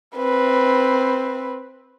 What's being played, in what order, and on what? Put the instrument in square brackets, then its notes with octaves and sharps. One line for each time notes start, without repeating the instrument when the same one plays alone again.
[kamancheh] C4 B4